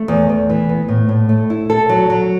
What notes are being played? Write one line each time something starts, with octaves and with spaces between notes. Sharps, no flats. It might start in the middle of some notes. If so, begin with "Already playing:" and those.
Already playing: A3
E2
E2
E3
B3
A2
A2
A3
E4
A4
F#3
F#3